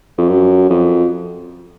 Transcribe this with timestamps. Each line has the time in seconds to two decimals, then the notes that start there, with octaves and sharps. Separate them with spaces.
0.18 F2
0.29 F#2
0.70 F2